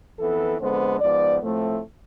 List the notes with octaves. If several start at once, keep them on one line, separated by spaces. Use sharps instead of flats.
F2 E3 B3 A4
F2 D3 G#3 B3 C5
G#2 F3 B3 D5
A2 F3 A3 C4